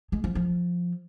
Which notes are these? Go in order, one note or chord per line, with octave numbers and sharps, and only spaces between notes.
G#3
F3
F3